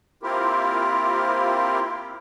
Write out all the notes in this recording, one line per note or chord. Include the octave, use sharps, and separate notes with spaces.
A#3 C4 E4 F4 G4 A#4